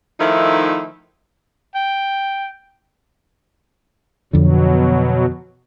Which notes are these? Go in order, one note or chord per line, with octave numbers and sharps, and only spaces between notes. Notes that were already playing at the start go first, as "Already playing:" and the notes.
D#3 F3 A3 D#4 E4
G5
F2 B2 D3 F#3